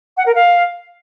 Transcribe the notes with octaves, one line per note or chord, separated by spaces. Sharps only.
F#5
A#4
F5